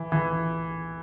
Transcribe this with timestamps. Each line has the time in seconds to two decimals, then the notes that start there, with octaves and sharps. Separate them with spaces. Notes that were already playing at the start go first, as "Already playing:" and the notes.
Already playing: E3
0.12 E3